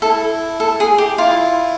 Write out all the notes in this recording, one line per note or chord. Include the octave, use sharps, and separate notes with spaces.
E4 A4
A4
G#4
G4
E4 F4